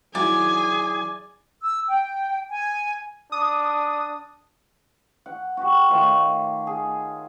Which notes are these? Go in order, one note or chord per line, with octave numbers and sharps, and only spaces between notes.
F#3 E4 G#4 D5 G#5
E6
G5
G#5
D4 D#6
F#5
F#4 G4
D#3 A3 F4 C#5
G#4